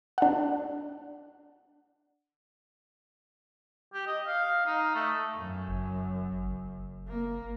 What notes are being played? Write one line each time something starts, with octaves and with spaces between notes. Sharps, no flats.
D4 F#5
G4
D#5
F5
D#4
A3
F#2
F#1
F#1
A#3